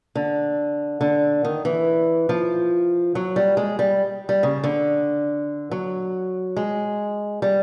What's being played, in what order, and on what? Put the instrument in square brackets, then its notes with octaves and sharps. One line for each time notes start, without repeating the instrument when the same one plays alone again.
[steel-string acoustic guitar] D3
D3
D#3
E3
F3
F#3
G3
G#3
G3
G3
C#3
D3
F#3
G#3
G3